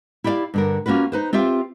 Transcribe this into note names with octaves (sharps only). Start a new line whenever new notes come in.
E4 G4 D5 E5 F5
G2 D3 A#4
A#3 C#4 F4 F#4 B4
D#4 B4 C5
C4 F4 G4 E5 F5